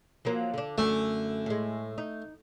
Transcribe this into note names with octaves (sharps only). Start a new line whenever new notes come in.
F3 F#3 A#3
D3 D4
F#2 D3 A3
A2 G#3
D#4